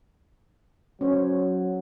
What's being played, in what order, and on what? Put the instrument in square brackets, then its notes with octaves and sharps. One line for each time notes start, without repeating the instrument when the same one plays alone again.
[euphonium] F#3 [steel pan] C#4 C5 C#5